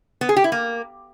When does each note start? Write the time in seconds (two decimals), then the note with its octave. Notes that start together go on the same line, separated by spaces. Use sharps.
0.21 B3
0.29 G#4
0.37 G4
0.44 E4
0.52 A#3